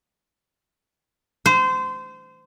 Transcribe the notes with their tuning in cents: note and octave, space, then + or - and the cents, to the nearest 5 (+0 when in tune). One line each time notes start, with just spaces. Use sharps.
C5 -25